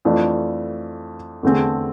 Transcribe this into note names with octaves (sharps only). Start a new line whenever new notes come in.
F2 E3 A3 D4 F4
E2 D3 A3 C4 G#4